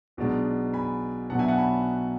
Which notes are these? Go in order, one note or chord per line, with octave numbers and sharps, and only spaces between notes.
B1 B2 G#3 D4
G#5 B5
B1 B2 F#3 B3 D4 F#5 A5
E5 G#5
F#5 A5
G#5 B5